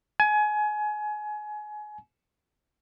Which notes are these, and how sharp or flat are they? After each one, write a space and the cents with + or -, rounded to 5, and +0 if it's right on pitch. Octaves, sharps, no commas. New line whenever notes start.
G#5 +25